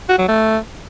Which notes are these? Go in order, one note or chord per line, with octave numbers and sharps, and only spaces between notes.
F#4
F#3
A3